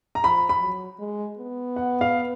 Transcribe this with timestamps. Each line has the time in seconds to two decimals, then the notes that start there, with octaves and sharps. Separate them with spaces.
0.15 A#5
0.24 F3 B5
0.49 B5
0.61 F#3
1.00 G#3
1.38 B3
1.76 F#5
2.01 F5